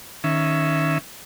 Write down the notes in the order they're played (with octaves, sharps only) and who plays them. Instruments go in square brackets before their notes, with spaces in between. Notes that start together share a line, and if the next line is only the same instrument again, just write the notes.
[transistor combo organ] D#3 C#4 E5